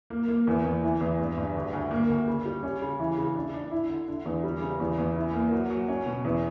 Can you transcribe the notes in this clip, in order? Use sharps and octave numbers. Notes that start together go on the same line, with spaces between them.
A#3
A#3
E2
E2
E3
E2
G2
G2
D2
D2
A#3
D2
C#3
G3
C#4
C#3
E3
C#3
D4
D4
E4
D3
D3
E2
G3
C#3
E2
E2
E4
A#3
F#3
F#3
C#4
B2
E2